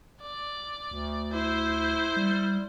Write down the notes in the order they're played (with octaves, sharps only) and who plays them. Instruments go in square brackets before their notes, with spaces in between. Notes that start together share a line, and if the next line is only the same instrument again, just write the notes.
[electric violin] D5
[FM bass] D2
[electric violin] E4 C5
[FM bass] G3